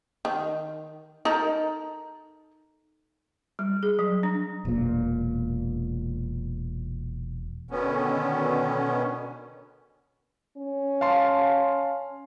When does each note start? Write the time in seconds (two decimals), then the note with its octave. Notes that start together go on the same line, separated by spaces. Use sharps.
0.25 D#3
1.25 D#4 A4 A#4
3.59 G3
3.83 G#4
3.99 F#3
4.23 D4
4.65 E1 A#2
7.71 B2 D3 D#3 B3 C#4
10.57 C#4
11.01 F5 A5 C6